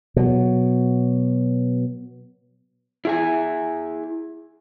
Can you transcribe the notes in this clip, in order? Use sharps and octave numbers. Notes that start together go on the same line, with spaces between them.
B2 F#3
E4 G#4 G#5